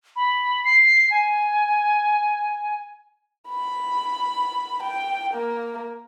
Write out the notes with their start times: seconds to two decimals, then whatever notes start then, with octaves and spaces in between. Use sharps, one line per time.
0.16 B5
0.65 C7
1.11 G#5
3.49 B5
4.83 G5
5.34 A#3